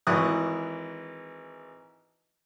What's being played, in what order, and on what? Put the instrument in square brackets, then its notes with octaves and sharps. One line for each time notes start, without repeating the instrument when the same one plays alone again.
[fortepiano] G#1 E3 C#6 D#6 F#6